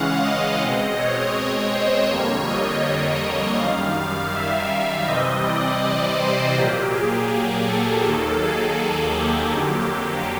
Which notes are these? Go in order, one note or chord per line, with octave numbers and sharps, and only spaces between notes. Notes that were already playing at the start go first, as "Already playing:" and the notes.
Already playing: C#3 E3 G#3 C#4 F5 F#5
D#5
B2 G#3 C4
C#5
C5
F2 D3 G3 A#3 C#5
D#5
F#2 D#3 G3 F5
E5
C3 E3 G3 C4 D#5
D5
C5
A#2 F#3 A#3 G4
G#4
A4
D#2 D#3 F#3 A#3
G#4
G4
F2 D3 F#3 A#3